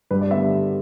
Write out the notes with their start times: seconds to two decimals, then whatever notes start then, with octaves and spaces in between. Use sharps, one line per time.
0.11 G2 B4
0.21 D5
0.31 D3 B3 E5